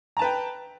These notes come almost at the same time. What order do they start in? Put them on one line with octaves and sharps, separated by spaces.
A#5 A5 B4 G5